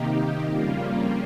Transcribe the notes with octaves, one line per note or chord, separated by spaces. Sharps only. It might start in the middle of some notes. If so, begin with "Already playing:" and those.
Already playing: C3 D#3 A#3 D#4 G4
F2 C#3 G3 A#3 F4